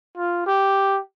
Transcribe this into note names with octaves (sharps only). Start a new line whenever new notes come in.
F4
G4